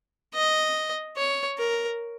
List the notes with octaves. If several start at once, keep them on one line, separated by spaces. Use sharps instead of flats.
D#5
C#5
A#4